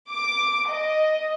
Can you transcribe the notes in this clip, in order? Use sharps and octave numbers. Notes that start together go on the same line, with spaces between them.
D6
D#5